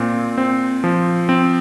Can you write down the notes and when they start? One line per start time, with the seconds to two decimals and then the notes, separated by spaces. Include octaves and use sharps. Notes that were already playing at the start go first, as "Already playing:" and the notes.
Already playing: A#2 C4
0.38 C4
0.84 F3
1.29 C4